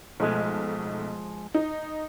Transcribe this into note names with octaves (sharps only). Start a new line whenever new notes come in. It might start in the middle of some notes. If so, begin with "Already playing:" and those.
B1 F3 G#3 A3
D#4